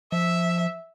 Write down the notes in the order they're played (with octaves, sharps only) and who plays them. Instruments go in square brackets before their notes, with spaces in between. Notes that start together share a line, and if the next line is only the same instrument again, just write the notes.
[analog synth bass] F3 [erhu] E5